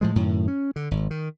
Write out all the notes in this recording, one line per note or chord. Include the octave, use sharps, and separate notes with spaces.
A2 F3 G#3
F#2 A2 D#3
C#4
D3
G#1
D#3